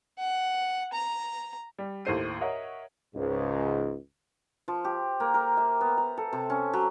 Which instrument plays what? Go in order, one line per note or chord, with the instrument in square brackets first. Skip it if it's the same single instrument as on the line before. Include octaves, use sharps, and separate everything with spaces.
[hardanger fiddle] F#5
A#5
[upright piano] G3
D#2 A2 A4 C5 C7 D#7
A#4 C#5 D#5 E5 F#5
[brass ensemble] C#2 G#2
[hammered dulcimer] F3
G4
A#3
A#4
E5
B3
A#5
A4
C3
C#4
F#3